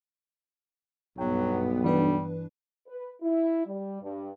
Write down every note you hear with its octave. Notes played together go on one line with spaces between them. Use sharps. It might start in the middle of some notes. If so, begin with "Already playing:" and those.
B1 G2 F#3 B3 F#5 G5
E3 G3 D4 B4
B4
E4
G3
G2